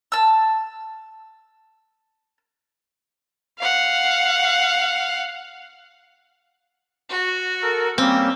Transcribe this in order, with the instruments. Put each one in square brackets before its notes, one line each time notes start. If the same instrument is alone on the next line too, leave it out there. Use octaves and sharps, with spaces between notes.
[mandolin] A5 E6
[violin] F5 F#5
[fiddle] F#4
[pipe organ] A4 A#4
[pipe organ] G3 A#3 C#4 [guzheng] C4